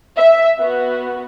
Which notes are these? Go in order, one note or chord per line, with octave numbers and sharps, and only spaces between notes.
E5
B3 F#4